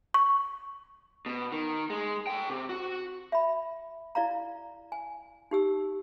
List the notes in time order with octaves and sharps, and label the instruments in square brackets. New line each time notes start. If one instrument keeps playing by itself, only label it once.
[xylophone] C#6
[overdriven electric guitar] B2
D#3
G#3
A4 G5
C3
F#4
[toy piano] E5 B5
E4 D5 F5 A#5
G#5
D#4 G4 E6